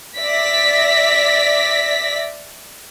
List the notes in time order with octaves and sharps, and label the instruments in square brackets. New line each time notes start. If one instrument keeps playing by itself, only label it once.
[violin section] D5 E5 A#6 B6